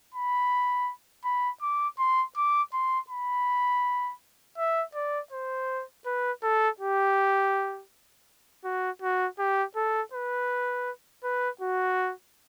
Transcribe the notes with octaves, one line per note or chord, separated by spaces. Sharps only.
B5
B5
D6
C6
D6
C6
B5
E5
D5
C5
B4
A4
G4
F#4
F#4
G4
A4
B4
B4
F#4